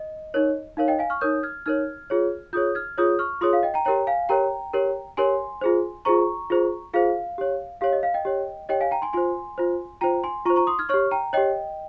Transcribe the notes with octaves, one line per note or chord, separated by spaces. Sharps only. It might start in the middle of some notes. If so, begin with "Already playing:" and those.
Already playing: D#5
D#4 A#4 C#5
D#4 A#4 C#5 F5
D#5 G5
F5 G#5
C#6 F6
D#4 A#4 C#5 D#6 G6
F6 G#6
D#4 A#4 C#5 F6 G#6
F4 G#4 C#5
F4 G#4 C#5 D#6 G6
F6 G#6
F4 G#4 C#5 D#6 G6
C#6 F6
F4 G#4 C#5 C6 D#6
F5
D#5 G5
G5 A#5
G4 A#4 C#5 G5 A#5
F5 G#5
G4 A#4 C#5 G5 A#5
G4 A#4 C#5
G4 A#4 C#5 G#5 C6
F4 G#4 C5
F4 G#4 C5 A#5 C#6
F4 G#4 C5
F4 G#4 C5 F5
G4 C#5
G4 C#5 F5
D#5
F5
D#5 G5
G4 C#5
G4 C#5 D#5 G5
F5 G#5
G5 A#5
G#5 C6
F4 C5 G#5 C6
F4 C5
F4 C5 G5 A#5
G#5 C6
F4 C5 A#5 C#6
A#5 C#6
C6 D#6
F6 G#6
G4 C#5 C#6 F6
G5 A#5
G4 C#5 D#5 G5